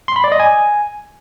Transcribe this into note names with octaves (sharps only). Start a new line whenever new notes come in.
C6
B5
D5
D#5
G#5